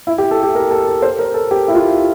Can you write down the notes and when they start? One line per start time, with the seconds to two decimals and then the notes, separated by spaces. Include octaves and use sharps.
0.07 E4
0.18 G4
0.31 A4
0.43 G4
0.55 A#4
0.71 A4
0.87 A4
1.02 C5
1.19 A#4
1.34 A4
1.51 G4
1.68 E4
1.74 F4